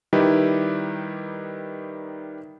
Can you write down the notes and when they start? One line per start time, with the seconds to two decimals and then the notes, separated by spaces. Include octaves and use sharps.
0.13 D#3 G3 D#4 E4 G4 B4